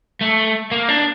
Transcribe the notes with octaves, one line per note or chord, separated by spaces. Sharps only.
A3
A#3
D4